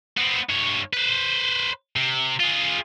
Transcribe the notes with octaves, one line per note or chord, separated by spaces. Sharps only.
B3 C4
G2 C#5
B4 C5
C3
F4 G#4